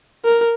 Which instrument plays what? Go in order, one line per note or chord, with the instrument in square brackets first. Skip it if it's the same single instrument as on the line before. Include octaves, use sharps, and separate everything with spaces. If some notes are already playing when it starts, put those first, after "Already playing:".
[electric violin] A#4